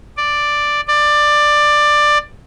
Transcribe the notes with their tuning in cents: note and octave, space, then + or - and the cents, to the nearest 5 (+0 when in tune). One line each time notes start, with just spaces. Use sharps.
D5 +5
D5 +15